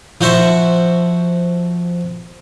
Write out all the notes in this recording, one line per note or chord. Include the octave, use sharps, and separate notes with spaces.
F3 F#4 C5 E5 C#6